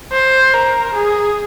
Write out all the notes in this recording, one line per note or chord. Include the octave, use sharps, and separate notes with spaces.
C5
A#4
G#4